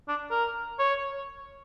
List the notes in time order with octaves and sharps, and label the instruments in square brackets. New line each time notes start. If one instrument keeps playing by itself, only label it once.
[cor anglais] D4
A#4
C#5